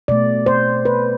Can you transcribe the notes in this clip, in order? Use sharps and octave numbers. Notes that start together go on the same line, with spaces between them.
B2 A3 D5
C5
B4